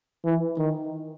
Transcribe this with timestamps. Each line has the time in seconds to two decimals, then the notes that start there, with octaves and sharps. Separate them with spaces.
0.24 E3
0.58 D#3